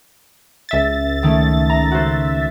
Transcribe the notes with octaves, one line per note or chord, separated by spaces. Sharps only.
C#2 E5 A6
D#3 A3 C#4
A#5
F#4 C5